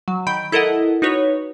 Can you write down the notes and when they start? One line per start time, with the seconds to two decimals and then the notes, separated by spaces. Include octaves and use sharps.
0.08 F#3
0.27 D#3 B5 G6 D7
0.52 E4 A4 A#4 D#5 F#5
1.02 D#4 F#4 B4 C#5